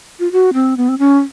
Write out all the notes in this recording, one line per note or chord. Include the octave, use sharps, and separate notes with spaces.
F4
F#4
C4
B3
C4
C#4